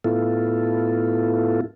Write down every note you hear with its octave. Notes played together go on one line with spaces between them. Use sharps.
A2 B3 E4 F4 A4